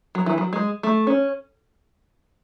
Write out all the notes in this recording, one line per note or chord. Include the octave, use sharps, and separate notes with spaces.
F#3
E3
F#3
G#3
A3
C#4